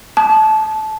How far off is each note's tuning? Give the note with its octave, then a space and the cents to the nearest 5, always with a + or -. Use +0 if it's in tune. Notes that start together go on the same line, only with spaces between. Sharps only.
A5 -20